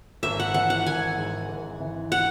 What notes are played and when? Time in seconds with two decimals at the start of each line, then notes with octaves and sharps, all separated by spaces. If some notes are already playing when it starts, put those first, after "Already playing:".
0.23 G#1 E5
0.40 F#5
0.54 E3 F#5
0.70 F#5
0.86 G#1 G#5
1.18 G#2
1.49 G#1
1.80 E3
2.12 F#5